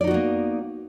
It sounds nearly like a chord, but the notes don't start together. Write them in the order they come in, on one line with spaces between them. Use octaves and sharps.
D5 D#4 F#4 B3 A#3